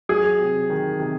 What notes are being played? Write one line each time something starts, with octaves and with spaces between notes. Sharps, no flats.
F#3 G#4
C3
D#3
C3